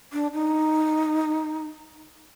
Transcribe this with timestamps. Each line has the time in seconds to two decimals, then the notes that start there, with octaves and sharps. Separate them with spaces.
0.13 D4
0.34 D#4